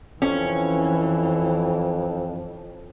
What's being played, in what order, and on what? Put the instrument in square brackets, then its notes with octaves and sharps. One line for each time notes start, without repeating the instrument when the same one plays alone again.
[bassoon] F2 [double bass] E3 [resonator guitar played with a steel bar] C#4